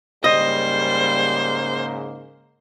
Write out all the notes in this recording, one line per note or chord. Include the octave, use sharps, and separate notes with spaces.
G#2 C#3 G3 A#3 C5 D#5